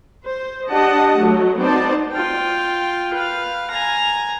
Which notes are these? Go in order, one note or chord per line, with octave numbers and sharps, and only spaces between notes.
C5
D4 G4 D#5 F#5 A5
F#3 A3
B3 C4 D#4 C5 D5 A5
F4 G5
B4 F5
G#5 A#5